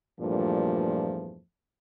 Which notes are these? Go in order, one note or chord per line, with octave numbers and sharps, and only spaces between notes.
E2 G2 A#2 F3 A3